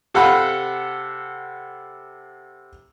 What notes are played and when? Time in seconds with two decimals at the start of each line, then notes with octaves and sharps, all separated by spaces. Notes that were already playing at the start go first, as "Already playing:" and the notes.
0.14 C3 A4 F5 F#5 B5